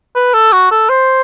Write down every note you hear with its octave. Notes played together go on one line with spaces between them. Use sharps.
B4
A4
F#4
A4
C5